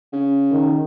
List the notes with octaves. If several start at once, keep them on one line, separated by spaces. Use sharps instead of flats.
C#3
D#3